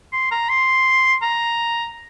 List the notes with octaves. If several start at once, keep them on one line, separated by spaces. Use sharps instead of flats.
C6
A#5
C6
A#5